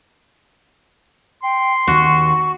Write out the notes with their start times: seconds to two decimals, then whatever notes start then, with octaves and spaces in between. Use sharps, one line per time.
1.43 G5 C6
1.87 D#2 D#3 F#4 C#6